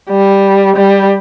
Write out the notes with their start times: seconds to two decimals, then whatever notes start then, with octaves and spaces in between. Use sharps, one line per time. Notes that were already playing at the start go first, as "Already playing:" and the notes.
0.10 G3
0.76 G3